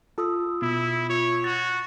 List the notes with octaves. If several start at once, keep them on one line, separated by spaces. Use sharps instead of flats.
F4 A4 D#6 E6
B2 E4
F4 C#5
F#4 A6